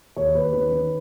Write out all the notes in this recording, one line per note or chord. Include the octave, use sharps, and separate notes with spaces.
D#2 C#5
D#2 B4
D#3 B4
D#3